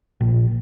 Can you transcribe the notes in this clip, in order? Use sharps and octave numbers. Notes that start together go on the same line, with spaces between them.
A#1